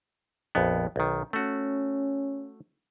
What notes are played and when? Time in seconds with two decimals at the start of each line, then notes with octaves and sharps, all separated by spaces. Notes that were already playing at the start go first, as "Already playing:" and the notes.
0.55 A#1 F2 B3
0.96 B1 D#3
1.33 A3 C#4 F#4